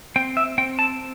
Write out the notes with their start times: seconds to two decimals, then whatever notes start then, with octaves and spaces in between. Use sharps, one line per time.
0.16 C4 G5
0.37 E5
0.58 C4 G5
0.79 A5